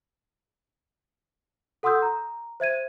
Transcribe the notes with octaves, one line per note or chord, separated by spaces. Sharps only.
A4 F#5 C6 D#6 E6 G6
A#5
C5 E5 G#6 D#7